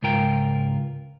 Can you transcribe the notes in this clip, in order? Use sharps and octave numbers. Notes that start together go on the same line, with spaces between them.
C#2 G#2 F4 A#4 G5